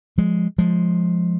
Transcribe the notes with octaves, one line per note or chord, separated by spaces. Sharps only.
F3 G#3
F3 G#3